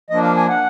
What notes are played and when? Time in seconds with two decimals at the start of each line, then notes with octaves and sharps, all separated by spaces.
0.10 F3 A#3 D4 D#5
0.23 F5
0.36 G#5
0.49 F#5